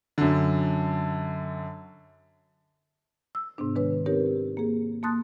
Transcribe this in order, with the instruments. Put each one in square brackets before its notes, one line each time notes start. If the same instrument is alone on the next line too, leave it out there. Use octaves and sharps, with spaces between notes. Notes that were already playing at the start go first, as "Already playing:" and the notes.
[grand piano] F#2 D3
[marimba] E6
G#2 C3 B3 D4
D#3 G#3 D4 B4 C#5
C4 D#4 G4 A#4 C#5
A#3 G#4
A#3 A5 C6 D#6 F#6 A6